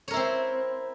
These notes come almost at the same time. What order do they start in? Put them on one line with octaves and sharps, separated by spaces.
C#5 A#4 E4 C4